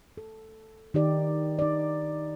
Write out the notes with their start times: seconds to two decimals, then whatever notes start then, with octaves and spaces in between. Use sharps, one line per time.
0.17 A4
0.94 D#3 D#4 G4 D5
1.59 D#4 D5